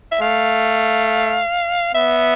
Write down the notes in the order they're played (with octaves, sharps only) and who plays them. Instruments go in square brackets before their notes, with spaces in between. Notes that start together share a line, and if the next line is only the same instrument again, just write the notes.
[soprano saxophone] E5
[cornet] A3 [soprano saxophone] F5
[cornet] B3 [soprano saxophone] E5